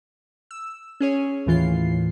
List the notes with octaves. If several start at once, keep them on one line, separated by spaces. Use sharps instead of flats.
E6
C#4 G#4 C#5
D#2 A2 E3 F4 C7